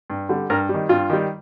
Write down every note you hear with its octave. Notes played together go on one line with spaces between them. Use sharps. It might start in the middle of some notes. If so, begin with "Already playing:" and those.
G2
D3 G3
G2 A#4
G3
D#3
G2 F4
D#3 G3